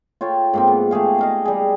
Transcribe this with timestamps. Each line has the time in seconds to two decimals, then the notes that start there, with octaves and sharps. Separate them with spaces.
0.21 F4 A4 C#5 G5
0.53 G#2 A#3 C4
0.67 B3
0.91 A3 G4 G#4 F5
1.19 D#5 F5 A#5
1.45 G3 G#4